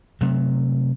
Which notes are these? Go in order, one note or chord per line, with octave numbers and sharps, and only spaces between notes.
C3 F#3 A3